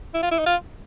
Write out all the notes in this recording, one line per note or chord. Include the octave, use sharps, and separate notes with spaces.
E4
F4
E4
D#4
F4